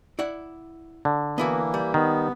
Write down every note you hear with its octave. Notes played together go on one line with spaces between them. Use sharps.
E4 D5 F#5
D3
E3 A#3 B3 E4 F#4
G3
D#3 B3